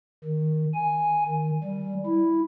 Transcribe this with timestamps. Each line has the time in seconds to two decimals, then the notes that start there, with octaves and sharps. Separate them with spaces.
0.24 D#3
0.74 G#5
1.28 D#3
1.64 G3
2.06 E4